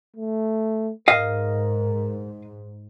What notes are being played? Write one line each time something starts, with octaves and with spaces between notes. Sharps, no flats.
A3
G#2 A#4 D#5 F5